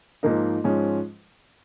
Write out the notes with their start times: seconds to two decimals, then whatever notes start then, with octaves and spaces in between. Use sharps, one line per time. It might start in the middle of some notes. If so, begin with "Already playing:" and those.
0.23 G#2 F3 A#3 D#4
0.64 G#2 F3 G#3 C#4